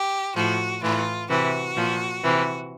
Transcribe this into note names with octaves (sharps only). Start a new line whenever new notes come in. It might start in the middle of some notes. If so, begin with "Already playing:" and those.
Already playing: G4
A2 F3 F#4
A2 E3 F4
C3 E3 F#4
A#2 F3
C3 E3